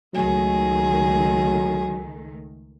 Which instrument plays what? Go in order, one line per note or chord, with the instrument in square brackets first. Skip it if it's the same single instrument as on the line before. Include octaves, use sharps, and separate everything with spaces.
[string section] C#2 D#3 A3 [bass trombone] F#3 [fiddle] G#4